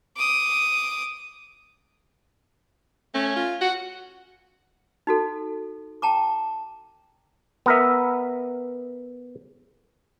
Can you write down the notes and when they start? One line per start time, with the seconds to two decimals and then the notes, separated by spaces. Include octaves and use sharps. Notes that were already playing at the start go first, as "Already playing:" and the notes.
0.17 D6 D#6
3.14 A3 C#4
3.36 F4
3.61 F#4 F#5
5.07 D#4 F#4 A4
6.02 G5 A5 A#5 D6
7.66 B3 A#4 E5